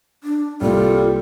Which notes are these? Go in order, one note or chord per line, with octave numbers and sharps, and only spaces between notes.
D4
C2 G3 A#3 F4 A4